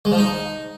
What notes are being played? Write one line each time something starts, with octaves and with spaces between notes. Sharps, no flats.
G#3
F3
D#4